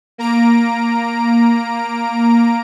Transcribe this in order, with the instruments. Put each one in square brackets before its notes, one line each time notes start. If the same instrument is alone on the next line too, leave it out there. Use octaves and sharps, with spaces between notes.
[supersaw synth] A#3 A#5 D7